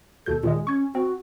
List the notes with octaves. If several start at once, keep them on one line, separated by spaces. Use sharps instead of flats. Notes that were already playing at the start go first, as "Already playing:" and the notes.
D#2 B2 A4 G6
A#2 D#3 G#3 G#4
C#4 C#6 G#6
C4 F#4